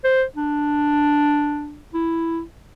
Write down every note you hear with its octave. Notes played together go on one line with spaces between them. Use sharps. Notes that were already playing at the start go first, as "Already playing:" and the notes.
C5
D4
E4